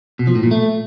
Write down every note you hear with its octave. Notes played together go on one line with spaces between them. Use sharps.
B2
F3
A2
A#2
A3